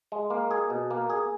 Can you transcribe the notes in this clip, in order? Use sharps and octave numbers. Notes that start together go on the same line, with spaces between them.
G#3
A#3
G#4
B2
A#3
G#4